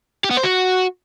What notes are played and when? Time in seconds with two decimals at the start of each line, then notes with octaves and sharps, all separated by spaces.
0.24 G4
0.31 B3
0.37 C5
0.44 F#4